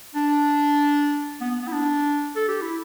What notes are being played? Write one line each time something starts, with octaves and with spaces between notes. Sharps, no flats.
D4
B3
B3
B3
E4
D4
A4
G4
E4